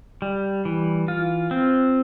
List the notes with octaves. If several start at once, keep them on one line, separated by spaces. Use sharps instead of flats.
G3
E3
F4
C4